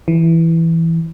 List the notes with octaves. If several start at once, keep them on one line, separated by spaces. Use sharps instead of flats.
E3